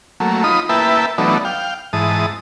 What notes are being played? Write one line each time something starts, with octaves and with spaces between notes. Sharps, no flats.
F#3 A3 A#3
D#4 F4 B5 D#6
A#3 E4 B4 E5 G5 A5
E3 F#3 A3 B3 D4 D#4
F5 G5
G#2 E3 A5 D#6